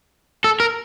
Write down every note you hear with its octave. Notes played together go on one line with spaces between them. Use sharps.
A4
A#4